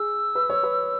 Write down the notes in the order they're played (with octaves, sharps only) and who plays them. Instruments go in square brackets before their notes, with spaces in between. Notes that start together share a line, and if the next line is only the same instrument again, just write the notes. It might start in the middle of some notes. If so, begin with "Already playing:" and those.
Already playing: [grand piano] G#4 [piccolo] E6
[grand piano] B4
C#5
B4